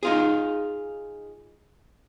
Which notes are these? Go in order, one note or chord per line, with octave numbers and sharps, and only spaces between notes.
D#4 F4 G#4